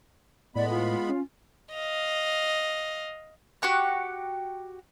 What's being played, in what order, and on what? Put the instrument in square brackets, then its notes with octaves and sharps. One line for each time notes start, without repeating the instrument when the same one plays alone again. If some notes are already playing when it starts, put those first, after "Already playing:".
[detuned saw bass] A2 [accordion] G#3 B3 B5 [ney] D5
[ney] F4
[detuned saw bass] C#4
[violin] D#5 F5
[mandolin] F#4 G4 C#6 F#6